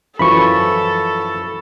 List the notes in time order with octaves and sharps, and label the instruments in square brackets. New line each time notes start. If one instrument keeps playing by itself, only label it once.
[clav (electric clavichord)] F#2 E3 F3 [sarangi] A4 [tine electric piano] B5 C#6